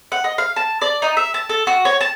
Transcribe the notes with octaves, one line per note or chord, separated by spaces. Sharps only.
F#5
D#5
F5
A5
D5
D#4
E5
A5
A4
F#4
C#5
A5